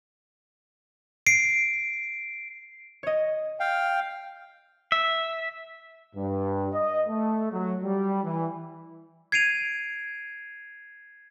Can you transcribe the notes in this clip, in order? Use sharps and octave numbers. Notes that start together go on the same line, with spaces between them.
C7 D7
C#5 D#5
F5 G5
E5
G2
D#5
A3
F#3
G3
E3
G#6 C7 D7 D#7 F7